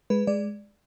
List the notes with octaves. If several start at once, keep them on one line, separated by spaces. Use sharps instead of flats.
G#3 B4
G#3 D5